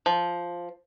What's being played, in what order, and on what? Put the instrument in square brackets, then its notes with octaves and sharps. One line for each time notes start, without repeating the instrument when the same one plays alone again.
[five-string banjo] F3